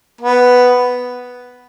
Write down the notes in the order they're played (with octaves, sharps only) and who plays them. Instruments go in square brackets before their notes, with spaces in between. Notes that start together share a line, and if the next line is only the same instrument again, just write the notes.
[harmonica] B3